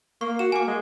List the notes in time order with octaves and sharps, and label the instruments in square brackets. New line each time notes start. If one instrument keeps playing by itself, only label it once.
[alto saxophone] A#3 [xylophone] C#6
[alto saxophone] F#4 [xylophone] E7
[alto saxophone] A#3 [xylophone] G#5 D6
[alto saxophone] G#3